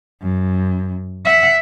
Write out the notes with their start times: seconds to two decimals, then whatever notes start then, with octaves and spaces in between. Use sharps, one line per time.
0.22 F#2
1.25 E5 F#5